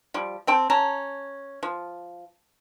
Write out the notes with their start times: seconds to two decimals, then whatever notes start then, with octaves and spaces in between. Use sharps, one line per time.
0.14 F3 G3
0.47 C4 G5 A5
0.70 C#4 A5 A#5
1.63 F3